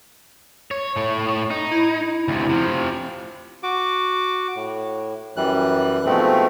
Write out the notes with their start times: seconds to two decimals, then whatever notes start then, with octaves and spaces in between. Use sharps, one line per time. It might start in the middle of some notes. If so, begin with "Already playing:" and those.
0.71 C#5
0.96 A2 C#5
1.50 D#4
1.71 E4
2.28 D2 C3
2.49 C3 F3
3.63 F#4 D6
4.56 A2
5.37 F#2 E3 G3 F#6
6.06 G#2 B2 F3 G#3 A3 C4